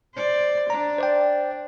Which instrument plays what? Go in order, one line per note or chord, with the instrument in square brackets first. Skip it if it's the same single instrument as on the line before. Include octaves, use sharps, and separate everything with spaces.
[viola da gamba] C5 D5
[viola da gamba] D4 [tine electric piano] A#5
[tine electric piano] C5 D5 G5